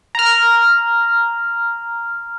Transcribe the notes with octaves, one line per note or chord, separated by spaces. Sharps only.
A#5 F6